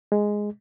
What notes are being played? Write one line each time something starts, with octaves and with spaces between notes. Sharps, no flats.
G#3